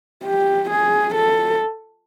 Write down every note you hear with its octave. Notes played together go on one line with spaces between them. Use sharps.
G4
G#4
A4